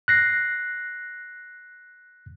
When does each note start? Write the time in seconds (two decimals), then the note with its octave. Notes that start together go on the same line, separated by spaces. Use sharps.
0.08 F#6 A#6 C7